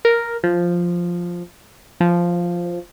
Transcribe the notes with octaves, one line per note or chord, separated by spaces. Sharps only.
A#4
F3
F3